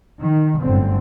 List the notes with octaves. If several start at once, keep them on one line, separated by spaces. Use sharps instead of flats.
D#3
G1 F#2 A2 D3 C4